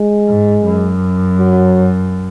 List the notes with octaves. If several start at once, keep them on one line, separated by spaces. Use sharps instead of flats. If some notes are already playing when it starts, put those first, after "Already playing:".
Already playing: G#3
G#2
F#2
F#3